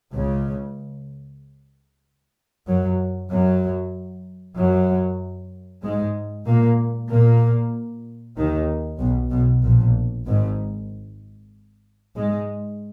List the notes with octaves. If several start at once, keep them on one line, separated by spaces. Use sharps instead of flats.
C#2 C#3
F#2 F#3
F#2 F#3
F#2 F#3
G#2 G#3
A#2 A#3
A#2 A#3
D#2 D#3
B1 B2
B1 B2
A#1 A#2
G#1 G#2
G#2 G#3